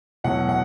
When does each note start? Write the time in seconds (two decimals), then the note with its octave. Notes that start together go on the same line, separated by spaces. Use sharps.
0.24 E2 B2 F#3 A3 F#5
0.49 F#5